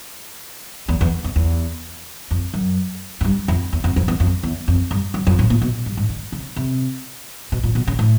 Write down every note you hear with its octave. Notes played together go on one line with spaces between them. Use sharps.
E2
E2
E2
E2
F2
F#2
F#2
G2
F2
E2
F2
F2
E2
F2
E2
F2
G2
F#2
F2
A2
A#2
B2
G2
G#2
D3
C#3
C3
B2
A#2
B2
C#3
A2